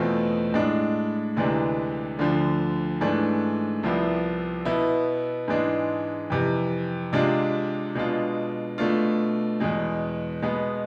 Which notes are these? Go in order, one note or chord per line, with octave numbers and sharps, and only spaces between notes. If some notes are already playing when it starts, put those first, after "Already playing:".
Already playing: E2 B2 A3 C4 F4
A2 G#3 D4
D2 C3 E3 G#3 D4
D2 D3 F3
G#2 E3 A3 D4
C2 C3 F3 B3 E4
B2 B3 E4
G#2 E3 G#3 D4
F2 C3 E3
C3 G#3 D4 F4
B2 G#3 D4 F4
B2 A3 D4 F4
E2 B2 G#3
B2 G#3 B3